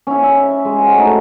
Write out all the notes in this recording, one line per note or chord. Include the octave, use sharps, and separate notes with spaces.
C#4 E4
E5
G#3
F#4 C5
A3 D#4